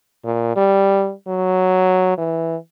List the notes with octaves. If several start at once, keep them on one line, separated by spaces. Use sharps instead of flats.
A#2
G3
F#3
E3